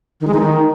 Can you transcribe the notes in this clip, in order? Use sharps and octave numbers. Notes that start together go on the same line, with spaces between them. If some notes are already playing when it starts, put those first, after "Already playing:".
D#3
G#3
D#4
D#3